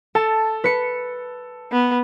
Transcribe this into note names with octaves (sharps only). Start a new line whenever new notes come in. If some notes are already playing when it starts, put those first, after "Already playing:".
A4 A5
B4 C#7
B3